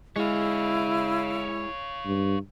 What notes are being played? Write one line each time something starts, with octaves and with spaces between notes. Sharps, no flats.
G#3 E4 C#5 F5
G2